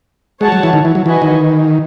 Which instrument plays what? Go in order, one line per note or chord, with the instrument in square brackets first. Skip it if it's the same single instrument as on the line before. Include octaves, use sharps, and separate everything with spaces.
[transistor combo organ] G#3 [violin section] F#4 C#5 F#5 A5
[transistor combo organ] F#3
E3
D#3
E3
F#3
[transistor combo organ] E3 [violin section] F#4 B4 D#5 G#5
[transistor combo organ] D#3